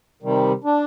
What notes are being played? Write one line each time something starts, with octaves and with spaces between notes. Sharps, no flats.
C3 D#3 G3
D4